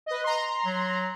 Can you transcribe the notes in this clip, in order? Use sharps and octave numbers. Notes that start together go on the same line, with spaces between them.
B4 D#5
A#5 C6
F#3